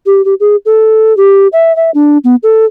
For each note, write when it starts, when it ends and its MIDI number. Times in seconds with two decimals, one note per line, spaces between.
0.06 0.24 67
0.25 0.34 67
0.40 0.56 68
0.65 1.16 69
1.17 1.47 67
1.53 1.74 76
1.76 1.90 76
1.94 2.18 62
2.24 2.35 59
2.43 2.65 69